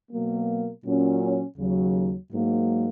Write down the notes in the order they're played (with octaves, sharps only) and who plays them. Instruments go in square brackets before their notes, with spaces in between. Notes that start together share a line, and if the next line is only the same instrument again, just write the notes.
[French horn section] B2 F#3 A#3
A#2 F#3 C#4
D#2 C#3 F#3
G#2 F#3 A#3